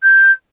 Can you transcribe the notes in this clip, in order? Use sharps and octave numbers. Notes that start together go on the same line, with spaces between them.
G6